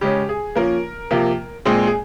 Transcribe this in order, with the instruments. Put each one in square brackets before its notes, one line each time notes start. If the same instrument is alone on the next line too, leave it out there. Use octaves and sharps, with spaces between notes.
[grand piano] C#3 G#3 C#4 G4
G#4
F3 A#3 C#4 A#4
C3 F3 A#3
A#2 G#3 C4 G#4
G#4